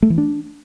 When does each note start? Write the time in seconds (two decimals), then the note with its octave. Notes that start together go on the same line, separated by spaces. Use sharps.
0.02 A3
0.10 E3
0.18 D4